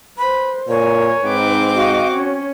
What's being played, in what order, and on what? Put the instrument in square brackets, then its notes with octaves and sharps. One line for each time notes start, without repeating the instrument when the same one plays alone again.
[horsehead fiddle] B4 C5 [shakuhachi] B5
[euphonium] A#2 [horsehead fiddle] A#4 G#5 [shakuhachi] C#5
[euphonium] G#2 [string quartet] C4 D6 [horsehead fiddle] D#4 B4
[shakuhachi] F#4 [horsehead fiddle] D#5 F5
[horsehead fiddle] C#4 C#5